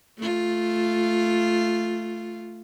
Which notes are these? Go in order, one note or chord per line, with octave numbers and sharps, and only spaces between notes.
A3 F4